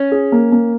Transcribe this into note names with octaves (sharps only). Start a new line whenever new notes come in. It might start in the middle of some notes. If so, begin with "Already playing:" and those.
Already playing: C#4
G#4
A#3
A#3